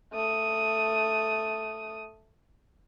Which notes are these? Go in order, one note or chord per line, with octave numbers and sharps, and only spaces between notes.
A3 D#6